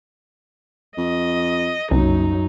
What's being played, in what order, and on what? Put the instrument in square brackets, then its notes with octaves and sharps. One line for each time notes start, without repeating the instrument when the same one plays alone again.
[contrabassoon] F2 [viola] D#5
[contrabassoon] F#1 [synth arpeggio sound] C2 [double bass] F#2 F#3 [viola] D#4